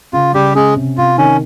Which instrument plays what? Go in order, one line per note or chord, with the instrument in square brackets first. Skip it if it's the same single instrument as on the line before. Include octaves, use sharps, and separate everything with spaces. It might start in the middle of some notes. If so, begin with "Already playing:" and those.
[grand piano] C#3 [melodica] F4
[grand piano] C#3 [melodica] G3 G4
[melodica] G#3 G#4 [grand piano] C#4
[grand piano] C3
[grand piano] C3 [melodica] F4
[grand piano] D#3 [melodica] C#4